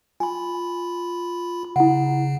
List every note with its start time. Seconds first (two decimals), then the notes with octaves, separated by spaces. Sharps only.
0.20 F4 G#5 B5
1.76 C#3 E4 F#5